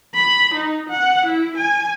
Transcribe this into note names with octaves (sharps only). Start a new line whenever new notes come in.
B5
D#4
F#5
E4
G#5